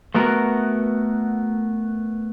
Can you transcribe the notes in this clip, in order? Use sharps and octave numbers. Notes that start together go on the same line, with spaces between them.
A3 B3 F#4 A#4